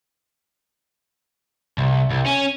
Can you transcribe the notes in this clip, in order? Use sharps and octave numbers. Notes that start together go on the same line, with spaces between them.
C2
C2
C#4